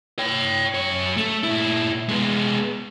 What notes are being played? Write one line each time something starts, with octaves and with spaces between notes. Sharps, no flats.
C#5 G5
F#2 C#5
A3
A#2 E4
G#3 B3